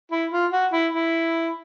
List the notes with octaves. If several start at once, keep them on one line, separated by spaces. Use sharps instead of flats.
E4
F4
F#4
E4
E4